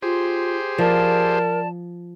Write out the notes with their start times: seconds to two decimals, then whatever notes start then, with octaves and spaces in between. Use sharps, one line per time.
0.02 F4 G4 G#4 C5
0.78 F3 A#4 D5 A5